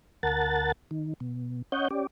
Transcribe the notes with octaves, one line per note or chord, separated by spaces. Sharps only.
D2 A#4 F#5 A5 A6
D#3
B2
C#4 C#5 D#5 F#5 G6
C#4 G4 D5